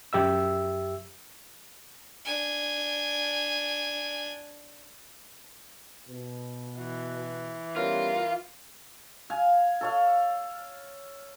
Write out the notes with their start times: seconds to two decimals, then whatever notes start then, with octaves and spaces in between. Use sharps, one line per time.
0.13 F#2 G4 E5 E6
2.25 D4 G#5
6.09 B2
6.79 E3 F#4
7.76 G3 B3 C#4 F4 A#4
9.30 F5 G#5
9.81 A4 C#5 F5